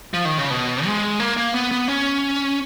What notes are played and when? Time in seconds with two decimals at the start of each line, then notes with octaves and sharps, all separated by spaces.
0.14 F3
0.25 D#3
0.38 C#3
0.50 B2
0.86 G#3
1.20 A#3
1.37 A#3
1.54 B3
1.71 B3
1.88 C#4